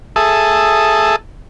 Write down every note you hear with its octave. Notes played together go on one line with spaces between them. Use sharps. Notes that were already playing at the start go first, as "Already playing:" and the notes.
G#4 A4 E5 A5 D#6